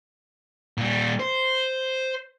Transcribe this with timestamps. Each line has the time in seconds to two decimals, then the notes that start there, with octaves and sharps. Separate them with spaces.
0.78 A#2 G3
1.19 C5